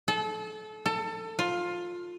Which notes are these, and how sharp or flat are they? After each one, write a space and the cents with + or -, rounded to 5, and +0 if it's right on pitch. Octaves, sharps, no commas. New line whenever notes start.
A4 -30
A4 +25
F4 +15